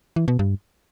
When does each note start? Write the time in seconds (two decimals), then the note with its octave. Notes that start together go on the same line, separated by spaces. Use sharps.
0.16 E3
0.28 B2
0.39 G2